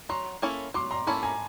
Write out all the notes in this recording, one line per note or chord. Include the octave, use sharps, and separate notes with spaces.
F#3 A#5 C6
A#3 C#4 E4 A4
F#3 C6 D6
A#5 C6
A#3 C#4 E4 A4 A5 B5
G#5 A#5